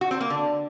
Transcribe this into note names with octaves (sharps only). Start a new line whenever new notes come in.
F#4
C4
A#3
D3